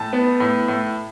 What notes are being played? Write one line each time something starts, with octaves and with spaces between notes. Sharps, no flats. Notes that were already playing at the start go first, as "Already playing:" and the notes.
Already playing: A2 A5
B3
A2
A2